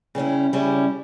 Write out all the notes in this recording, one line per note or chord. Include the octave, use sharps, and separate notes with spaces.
C#3 G3 C#4 E4
C#3 G3 C#4 E4